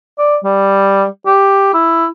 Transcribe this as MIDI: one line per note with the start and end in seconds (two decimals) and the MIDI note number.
0.18 0.36 74
0.44 1.06 55
1.26 1.74 67
1.74 2.07 64